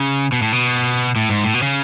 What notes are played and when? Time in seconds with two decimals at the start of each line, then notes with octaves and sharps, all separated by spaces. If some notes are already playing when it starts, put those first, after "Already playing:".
Already playing: C#3
0.32 B2
0.42 A2
0.52 B2
1.16 A2
1.30 G#2
1.44 A2
1.54 B2
1.62 C#3